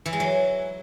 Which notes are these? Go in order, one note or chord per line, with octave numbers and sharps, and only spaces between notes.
E3
G#3
F#3